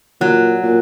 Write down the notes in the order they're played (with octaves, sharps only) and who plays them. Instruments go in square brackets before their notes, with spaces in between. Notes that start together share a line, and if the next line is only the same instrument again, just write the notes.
[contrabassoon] A#2 [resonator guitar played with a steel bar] F#3
[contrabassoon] A#2